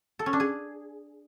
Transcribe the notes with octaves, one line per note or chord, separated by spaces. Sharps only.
A4
C#4
D4
G#4